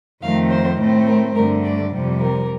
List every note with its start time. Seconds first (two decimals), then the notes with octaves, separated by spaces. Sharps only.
0.22 F2 D#3 A3 C4 F5
0.50 C5
0.79 A2 A3 C4
1.07 A#4
1.35 G2 D3 A3 A#4
1.63 D5
1.92 F2 C3 G3
2.20 A#4